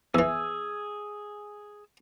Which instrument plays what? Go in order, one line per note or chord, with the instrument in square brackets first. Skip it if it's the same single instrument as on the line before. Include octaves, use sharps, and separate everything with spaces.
[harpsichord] E2 E3 [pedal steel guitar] G#4 G#5 E6